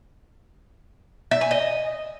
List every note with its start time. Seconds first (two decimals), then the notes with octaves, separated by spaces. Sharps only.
1.31 E5
1.41 G#5
1.51 D#5